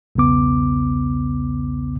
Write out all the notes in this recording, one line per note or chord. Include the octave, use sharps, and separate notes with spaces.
B1 E2 C#3 B3 D6